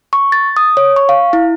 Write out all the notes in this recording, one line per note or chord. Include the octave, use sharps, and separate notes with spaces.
C#6
A6
D#6
C#5
C#6
F5
E4